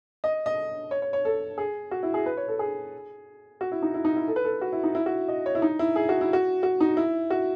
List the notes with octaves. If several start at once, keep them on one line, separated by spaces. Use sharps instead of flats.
D#5
D#5
C#5
C#5
C#5
A4
G#4
F#4
E4
G#4
B4
C#5
A4
G#4
F#4
E4
D#4
E4
D#4
E4
A4
B4
A4
F#4
E4
D#4
E4
F#4
D#5
C#5
E4
D#4
E4
G#4
F#4
E4
F#4
F#4
D#4
E4
F#4